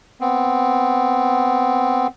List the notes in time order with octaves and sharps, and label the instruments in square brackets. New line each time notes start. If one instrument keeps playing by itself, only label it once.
[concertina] B3 C4